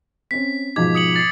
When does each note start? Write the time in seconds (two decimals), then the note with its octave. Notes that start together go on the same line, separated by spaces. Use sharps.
0.31 C4 C#4 B6
0.76 G#2 B2 F3 D6 G#6
0.95 D#6 C#7 F#7
1.16 A6 C7